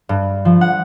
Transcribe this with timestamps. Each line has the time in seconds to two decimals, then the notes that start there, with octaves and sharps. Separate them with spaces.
0.09 G2
0.45 F3
0.61 F#5